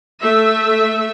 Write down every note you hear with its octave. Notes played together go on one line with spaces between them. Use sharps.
A3 E5